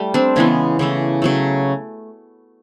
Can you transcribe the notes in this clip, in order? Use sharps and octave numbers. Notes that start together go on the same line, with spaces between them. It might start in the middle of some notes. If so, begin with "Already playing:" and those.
Already playing: G3 A3
C4 D4
C#3 E3 G#3 B3 C#4
C#3 E3 A3
C#3 F#3 A3